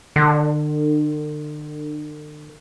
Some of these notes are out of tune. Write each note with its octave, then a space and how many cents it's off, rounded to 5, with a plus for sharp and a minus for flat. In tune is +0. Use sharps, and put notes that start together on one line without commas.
D3 +40